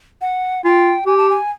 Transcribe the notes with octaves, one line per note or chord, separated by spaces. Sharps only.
F#5
F4 G5 G#5
G4 G#5
A5
G#5